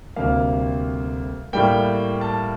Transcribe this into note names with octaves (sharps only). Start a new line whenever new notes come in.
D2 C3 G3 A#3 F5
A2 G3 A#3 G5
A5